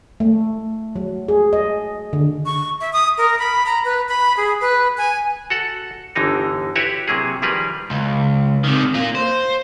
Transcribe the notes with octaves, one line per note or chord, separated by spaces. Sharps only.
A3
F#3
G#4
D#5
D3
C#6
E5
D#6
A#4
B5
A#5
B4
B5
G#4
B4
G#5
F#4 A4 F#5
G1 D3 E3 D#4 A#4
E4 F#4 G4 B4 C#5 E5
C3 F#3 A#3 G#4
D#3 F3 G3 G#4 A#4 B4
C#2
C3 D#3
A#3 F4
C5